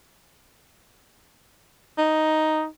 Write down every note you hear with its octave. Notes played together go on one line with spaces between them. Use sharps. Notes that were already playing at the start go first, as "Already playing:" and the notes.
D#4